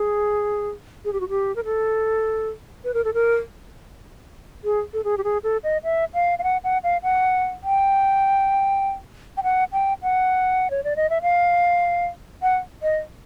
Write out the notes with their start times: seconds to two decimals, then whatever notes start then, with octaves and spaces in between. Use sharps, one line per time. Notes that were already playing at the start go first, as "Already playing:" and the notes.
Already playing: G#4
1.05 G#4
1.13 G4
1.20 F#4
1.29 G4
1.56 A#4
1.64 A4
2.84 B4
2.94 A#4
3.04 A4
3.14 A#4
4.64 G#4
4.93 A4
5.04 G#4
5.18 G4
5.24 G#4
5.43 A4
5.63 D#5
5.84 E5
6.14 F5
6.39 F5
6.43 F#5
6.64 F#5
6.83 F5
7.03 F#5
7.63 G5
9.37 G5
9.43 F#5
9.72 G5
10.02 F#5
10.70 C#5
10.84 D5
10.96 D#5
11.10 E5
11.22 F5
12.42 F#5
12.82 D#5